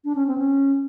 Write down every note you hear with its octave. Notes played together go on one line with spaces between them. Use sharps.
D4
C#4
C4
C#4